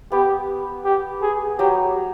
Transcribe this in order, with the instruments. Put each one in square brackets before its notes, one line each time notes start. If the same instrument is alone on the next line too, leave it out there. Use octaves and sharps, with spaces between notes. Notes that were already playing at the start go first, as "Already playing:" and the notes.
[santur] B3 [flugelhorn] G4
[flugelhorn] G4
G#4
[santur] F#3 [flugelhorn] G4